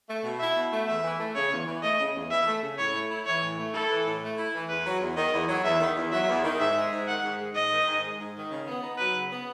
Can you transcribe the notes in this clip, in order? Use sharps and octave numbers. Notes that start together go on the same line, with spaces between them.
A3
B2
E4 E5
B2
A3
E2 E5
E3
A3
C#3 C#5
E2
E3
A3 D#5
C#3
E2
E3 E5
A3
C#3
A2 C#5
A3
E4
E3 C#5
A2
A3
E4 A4
E3
A2
A3
E4
E3
E2 B4
F#3
E2
D#3 D#5
E2
F#3
E2 E5
D#3
E2
F#3 E5
E2
D#3
G#2 E5
G#3
G#2
D#3 F#5
G#2
G#3
G#2 D#5
D#3
G#2
G#3
G#2
D#3
C#3
B3
D#4
F#3 B4
C#3
B3